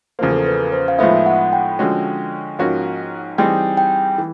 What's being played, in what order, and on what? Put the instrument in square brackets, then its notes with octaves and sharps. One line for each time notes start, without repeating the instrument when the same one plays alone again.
[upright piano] E2 C#3 F3 A#3 [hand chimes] C5
[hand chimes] A4
A#4
B4
C5
F5
[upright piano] A2 F3 G#3 B3 D#4 [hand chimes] E5
[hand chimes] F#5
G5
[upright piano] D3 F3 G#3 C#4 F#4
G#2 F3 A#3 C#4 F#4
[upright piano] E3 G3 C4 D#4 G#4 [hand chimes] G5
[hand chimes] G5
[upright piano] E3